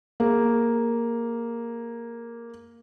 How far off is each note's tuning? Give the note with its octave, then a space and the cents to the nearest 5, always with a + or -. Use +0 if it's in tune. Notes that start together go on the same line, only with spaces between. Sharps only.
A#3 +0 G#4 +0